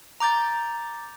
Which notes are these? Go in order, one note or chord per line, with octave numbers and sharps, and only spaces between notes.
A#5 D6 G6 A6